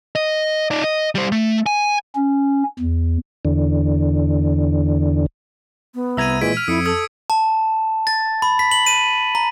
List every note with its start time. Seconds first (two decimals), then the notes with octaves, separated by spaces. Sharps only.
0.16 D#5
0.71 D#4 D5
0.84 D#5
1.15 G3 C5
1.32 A3
1.66 G#5
2.16 C#4
2.79 E2
3.45 E2 D3
5.95 B3
6.17 C2 E5 A#5 E6 G#6 D#7
6.41 A#2 E3 G#3 G#6 B6 D7
6.57 F6
6.68 F2 E4 D#6 C#7
6.86 A4 D#6 E6 G#6
7.30 A5
8.07 A6
8.42 B5
8.59 B6
8.71 F#7
8.87 D#7
9.35 A#5